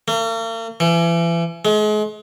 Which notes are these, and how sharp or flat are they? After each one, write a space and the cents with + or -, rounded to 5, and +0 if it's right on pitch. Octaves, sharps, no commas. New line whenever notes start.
A#3 -45
E3 +35
G#3 +35